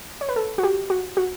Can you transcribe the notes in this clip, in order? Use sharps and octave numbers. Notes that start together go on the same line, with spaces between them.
C#5
B4
A4
F#4
G4
F#4
F#4